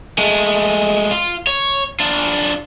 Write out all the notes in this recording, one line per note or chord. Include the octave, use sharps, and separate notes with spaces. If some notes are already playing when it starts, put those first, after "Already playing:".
G#3 A3
F4
C#5
D4 F4